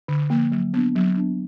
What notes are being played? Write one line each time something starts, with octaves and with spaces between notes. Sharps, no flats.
D3
F3 A#3
F#3
B3 D4
F#3
B3 D4